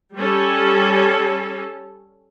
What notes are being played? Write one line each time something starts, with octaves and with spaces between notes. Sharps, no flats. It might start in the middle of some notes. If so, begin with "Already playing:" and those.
G3 C#4 A4